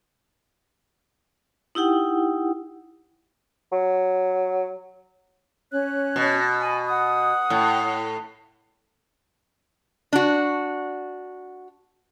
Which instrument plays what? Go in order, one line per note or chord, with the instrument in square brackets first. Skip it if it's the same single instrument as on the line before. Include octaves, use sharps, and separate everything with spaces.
[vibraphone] D#4 E4 G4 F#5 G5
[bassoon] F#3
[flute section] C#4 C#5 F#6
[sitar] B2
[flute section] G#5 B5
F#5 D#6
[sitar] A2
[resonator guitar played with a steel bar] D4 F#4